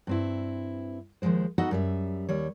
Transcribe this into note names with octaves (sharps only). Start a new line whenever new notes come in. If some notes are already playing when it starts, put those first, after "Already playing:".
G2 C4 E4
D#2 D#3 F3 G#3 C5
B3 D#4 F#4 A4 D#5 F#5
F#2 G3 E5
D#2 G3 C#5